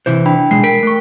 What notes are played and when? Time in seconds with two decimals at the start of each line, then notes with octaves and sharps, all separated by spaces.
0.06 C3 E3 C5
0.26 D4 G5 B5
0.51 B1 C#3 G#3 C7
0.64 A#4 G5 B6
0.83 A3 C#6